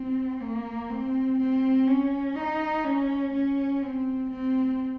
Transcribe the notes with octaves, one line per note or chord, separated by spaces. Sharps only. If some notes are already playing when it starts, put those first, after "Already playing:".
Already playing: C4
A#3
C4
C4
C#4
D#4
C#4
C#4
C4
C4